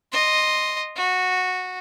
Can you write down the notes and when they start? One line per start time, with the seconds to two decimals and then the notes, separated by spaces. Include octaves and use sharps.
0.12 D#5 C6
0.96 F#4